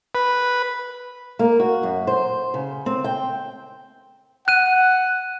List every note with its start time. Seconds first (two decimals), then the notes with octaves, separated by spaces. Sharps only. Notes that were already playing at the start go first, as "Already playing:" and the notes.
0.15 B4
1.39 A#3
1.60 F#4
1.83 F#2
2.07 C5
2.54 C#3
2.86 C4
3.04 G5
4.48 F#5 F#6 D#7